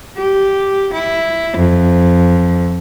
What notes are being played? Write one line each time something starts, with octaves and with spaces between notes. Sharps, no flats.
G4
E4
F2